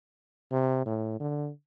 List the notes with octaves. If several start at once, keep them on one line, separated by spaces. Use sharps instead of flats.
C3
A2
D3